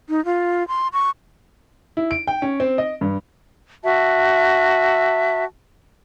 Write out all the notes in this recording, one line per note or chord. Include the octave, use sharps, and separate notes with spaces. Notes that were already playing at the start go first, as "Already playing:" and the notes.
D#4
F4
C6
C#6
E4
D7
G5
C#4
C4
D#5
G2
F#4 E5 A5